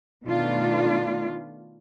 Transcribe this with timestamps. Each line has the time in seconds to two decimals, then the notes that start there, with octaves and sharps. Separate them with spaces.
0.24 B2 D#3 A3 B3 D4 F4